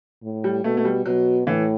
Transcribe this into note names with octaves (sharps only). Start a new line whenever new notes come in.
A2
G3
B2 A3
A3
G3
B2 F#3
A2 E3